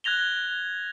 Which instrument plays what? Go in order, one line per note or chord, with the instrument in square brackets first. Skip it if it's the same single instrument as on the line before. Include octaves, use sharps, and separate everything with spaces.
[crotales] F#6 G#6 A#6 F7 G7